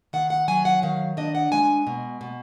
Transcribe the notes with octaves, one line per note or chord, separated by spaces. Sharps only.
D#3 F#5
F#5
F#3 G#5
F#5
D#3 F5
D4 D#5
F#5
G#3 G#5
B2
B2